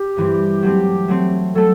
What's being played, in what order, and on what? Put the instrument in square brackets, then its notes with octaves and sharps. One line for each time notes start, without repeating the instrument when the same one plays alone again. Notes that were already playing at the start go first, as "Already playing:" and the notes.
Already playing: [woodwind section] G4
[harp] G2 E3 G3 C4
F#3 A3 C4
F#3 A3 C4
[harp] F#3 A3 [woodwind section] A4